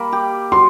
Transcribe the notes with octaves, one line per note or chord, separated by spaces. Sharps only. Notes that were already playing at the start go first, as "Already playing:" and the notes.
Already playing: G3 A#3 B5
G4
F#3 C6